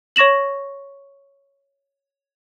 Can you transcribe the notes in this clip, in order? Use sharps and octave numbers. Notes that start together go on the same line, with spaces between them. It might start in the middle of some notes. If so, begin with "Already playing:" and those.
C#5 C#6 A#6 E7 F#7